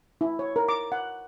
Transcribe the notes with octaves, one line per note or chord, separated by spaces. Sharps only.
E4
C#5
A#4
D6
F#5